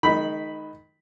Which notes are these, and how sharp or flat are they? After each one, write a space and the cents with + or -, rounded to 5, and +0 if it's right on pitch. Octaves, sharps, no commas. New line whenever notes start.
D#3 +0 G#3 +35 B5 +0